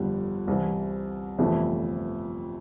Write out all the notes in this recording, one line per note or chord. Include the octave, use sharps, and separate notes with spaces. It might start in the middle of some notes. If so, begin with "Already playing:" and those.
Already playing: G1 F2 D3 G3
C2 C3 E3
G1 F2 C3 E3 A3